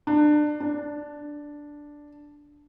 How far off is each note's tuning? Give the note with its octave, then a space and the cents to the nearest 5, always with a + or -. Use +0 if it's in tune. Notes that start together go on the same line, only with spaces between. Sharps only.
D4 +25
D4 +0